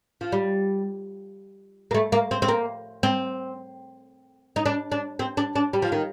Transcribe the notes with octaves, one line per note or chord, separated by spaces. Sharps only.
F3
G3
A#3
A3
A#3
C4
C4
A#3
C4
D#4
D4
D4
C4
D4
D4
G3
F3
D#3